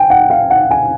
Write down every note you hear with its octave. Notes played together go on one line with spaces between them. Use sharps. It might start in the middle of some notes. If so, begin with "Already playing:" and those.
Already playing: G5 G#5
F#5
F5
F#5
G#5